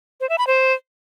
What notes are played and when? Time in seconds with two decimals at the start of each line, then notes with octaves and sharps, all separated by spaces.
0.21 C5
0.29 E5
0.38 B5
0.47 C5